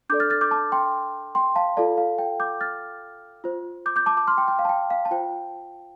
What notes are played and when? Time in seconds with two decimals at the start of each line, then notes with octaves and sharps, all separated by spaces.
0.10 D4 A4 D5 D6 G6
0.20 F6 A6
0.30 F6 A6
0.41 D6 G6
0.51 A5 D6
0.72 G5 C6
1.35 G5 C6
1.56 F5 A5
1.77 F4 A4 D5 F5 A5
1.97 F5
2.18 G5
2.40 D6 G6
2.61 F6 A6
3.44 F4 C5
3.86 D6 G6
3.96 D6 G6
4.06 A5 D6
4.17 A5 D6
4.27 C6 F6
4.38 G5 C6
4.48 G5
4.59 F5
4.65 A5
4.69 G5
4.90 F5
5.05 A5
5.11 F4 C5 G5